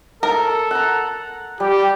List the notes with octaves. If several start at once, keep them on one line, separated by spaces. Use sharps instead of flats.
A4 A#4
F#5 A#5
G3 G4